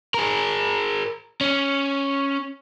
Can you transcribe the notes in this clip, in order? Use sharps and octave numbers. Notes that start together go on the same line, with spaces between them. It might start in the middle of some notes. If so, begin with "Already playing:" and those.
G#4 A#4
C#4